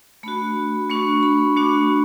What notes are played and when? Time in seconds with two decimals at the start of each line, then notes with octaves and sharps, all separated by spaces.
0.23 A3 D4 F#4 B5
0.90 A3 D4 F#4 C#6
1.23 B5
1.56 A3 D4 F#4 D6